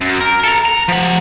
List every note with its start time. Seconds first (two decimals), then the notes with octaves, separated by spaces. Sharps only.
0.01 F#2
0.21 A#4
0.44 A4 A#5
0.66 A#5
0.88 F3 F#5